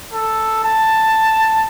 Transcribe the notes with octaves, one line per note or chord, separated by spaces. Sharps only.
A4
A5